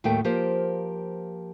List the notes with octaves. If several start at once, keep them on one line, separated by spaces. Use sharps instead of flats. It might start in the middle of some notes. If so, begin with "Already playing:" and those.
D#2 A2 F#3 A3 A#4 G5
F3 A#3 G4 A#4 C5